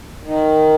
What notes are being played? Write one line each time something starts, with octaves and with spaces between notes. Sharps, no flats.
D#3